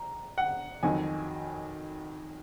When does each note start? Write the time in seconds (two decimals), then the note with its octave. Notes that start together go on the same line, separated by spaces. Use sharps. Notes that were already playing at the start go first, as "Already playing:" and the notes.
Already playing: A#5
0.38 F#5
0.83 F2 D#3 F#3 G#5